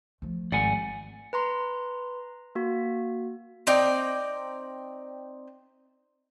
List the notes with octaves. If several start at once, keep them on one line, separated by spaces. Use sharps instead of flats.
F3 A3
G#1 D5 F#5 G#5
B4 A#5 C6
A#3 F#4
C4 D#4 D5 G5